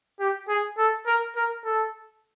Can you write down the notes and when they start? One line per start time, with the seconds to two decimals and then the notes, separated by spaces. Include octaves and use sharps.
0.20 G4
0.49 G#4
0.78 A4
1.07 A#4
1.36 A#4
1.65 A4